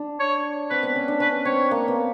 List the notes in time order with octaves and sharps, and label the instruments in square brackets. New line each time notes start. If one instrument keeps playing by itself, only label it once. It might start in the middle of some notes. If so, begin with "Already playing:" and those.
Already playing: [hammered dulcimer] D4
[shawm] C#5
[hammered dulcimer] C4 [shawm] B4
[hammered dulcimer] B3
C#4
D4
[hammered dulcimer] C#4 [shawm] B4
[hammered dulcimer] C4 [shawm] C#5
[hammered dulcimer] A#3
B3